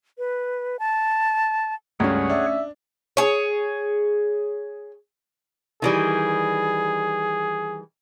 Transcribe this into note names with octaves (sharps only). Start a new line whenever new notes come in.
B4
A5
C#2 G2 A3 C#4 G#4 C#5 F#5
D4 E5
G#4 C#5
D#3 E3 G3 G#4